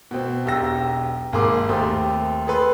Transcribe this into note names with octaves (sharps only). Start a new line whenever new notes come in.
B2 C4
E1 B1 G4 E6 A#6
G#1 A#3 G#4 C6 D6
D#2 A3 C4 G4 C6 D#6
G#4 A4 B4 C6